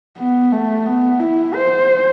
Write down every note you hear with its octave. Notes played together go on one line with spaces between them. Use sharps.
B3
A3
B3
E4
C5